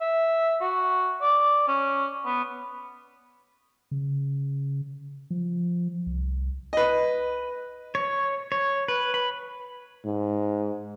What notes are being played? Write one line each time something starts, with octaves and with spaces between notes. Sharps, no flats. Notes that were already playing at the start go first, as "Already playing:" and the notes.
E5
F#4
D5
C#4
B3
C#3
F3
C2
B4 D#5
C#5
C#5
B4
B5
G#2